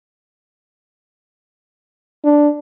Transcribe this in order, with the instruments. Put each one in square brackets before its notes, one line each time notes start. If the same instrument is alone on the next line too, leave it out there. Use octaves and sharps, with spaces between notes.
[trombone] D4